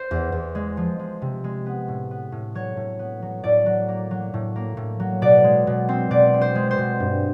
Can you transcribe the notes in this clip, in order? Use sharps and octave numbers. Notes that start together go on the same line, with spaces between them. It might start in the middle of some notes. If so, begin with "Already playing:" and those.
Already playing: C5
E2
E2
G#3
F3
G#3
C3
G#3
B3
A2
B3
A2
F#3 C#5
A2
B3
F#3
A2 D5
F#3
A#3
F#3
A2
A#3
A2
F#3
B2 D5
G#3
B2
C4
B2 D5
C4
C5
G#3
C5
B2
G2